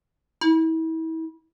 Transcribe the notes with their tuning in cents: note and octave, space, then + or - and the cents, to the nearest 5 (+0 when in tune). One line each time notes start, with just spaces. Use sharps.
E4 -35